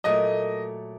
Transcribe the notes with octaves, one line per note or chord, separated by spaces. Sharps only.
A#2 F#3 A3 D#5